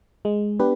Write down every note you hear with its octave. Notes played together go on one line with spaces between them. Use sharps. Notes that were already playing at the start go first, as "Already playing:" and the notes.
G#3
B3 D4 G4 B4